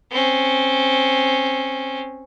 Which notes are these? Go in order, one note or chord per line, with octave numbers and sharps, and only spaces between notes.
C4 C#4